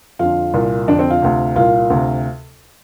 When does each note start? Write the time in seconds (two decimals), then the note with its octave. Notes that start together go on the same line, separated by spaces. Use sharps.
0.19 F2 D3 F4
0.54 C2 A#2
0.88 F2 D3 D4
0.99 C4
1.10 F4
1.22 D2 C3
1.56 C2 A#2 F4
1.90 D2 C3